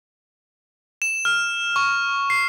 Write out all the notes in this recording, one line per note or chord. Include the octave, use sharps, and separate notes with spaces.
E7
F6
C#6
C7